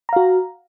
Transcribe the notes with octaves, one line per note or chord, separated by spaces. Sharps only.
F#4 F5 A#5